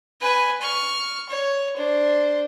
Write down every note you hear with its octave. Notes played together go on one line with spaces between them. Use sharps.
B4 G#5
C#6 F6
C#5
D4 C5